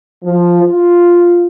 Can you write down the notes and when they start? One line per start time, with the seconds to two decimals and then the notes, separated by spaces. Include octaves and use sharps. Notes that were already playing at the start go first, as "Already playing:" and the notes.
0.24 F3
0.63 F4